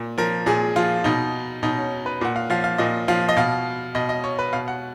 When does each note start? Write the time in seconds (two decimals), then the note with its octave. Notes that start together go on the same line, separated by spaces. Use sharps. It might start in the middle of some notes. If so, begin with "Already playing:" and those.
Already playing: A#2
0.18 F3 A#4
0.46 A#2 G#4
0.76 F3 F4
1.04 B2 D#4
1.63 B2 D#4
1.77 C#4
2.06 B4
2.21 A#2 F#5
2.36 F5
2.50 F3 F5
2.64 F5
2.78 A#2 D#5
3.08 F3 F5
3.29 D#5
3.37 B2 F5
3.95 B2 D#5
4.09 D#5
4.24 C#5
4.39 B4
4.53 B2 F5
4.68 F#5